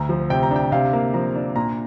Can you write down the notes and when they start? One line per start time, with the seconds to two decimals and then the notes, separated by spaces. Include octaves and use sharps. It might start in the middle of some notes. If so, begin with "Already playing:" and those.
Already playing: D2 A#5
0.09 F3
0.30 C3 G5
0.43 A#5
0.51 D4 G5
0.72 C3 F5
0.93 A#3
1.14 F3 A#5
1.35 D4
1.56 A#2 A#5